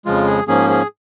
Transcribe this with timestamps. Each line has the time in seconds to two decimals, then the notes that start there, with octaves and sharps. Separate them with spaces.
0.06 F2 C#3 F3 G#3 F4
0.27 G#4
0.48 G#2 F3 A#3 C#4 G#4
0.70 G#4